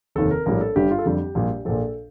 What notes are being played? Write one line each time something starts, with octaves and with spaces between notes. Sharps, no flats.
F1 D#2 D#3 A4
A#4
A#1 A2 G3 A#4
A4
G1 G2 D3 G3 G4
F4
A4
F2 D3 G3 G4
A#1 A#2 G3
A#1 A#2 F3 A4